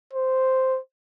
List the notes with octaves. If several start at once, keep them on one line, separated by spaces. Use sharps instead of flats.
C5